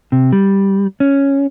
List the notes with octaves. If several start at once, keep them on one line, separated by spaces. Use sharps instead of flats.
C3
G3
C#4